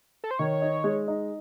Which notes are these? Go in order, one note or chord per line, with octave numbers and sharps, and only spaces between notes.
A4
C5
D#3 C#5
D#4
G#3
D#4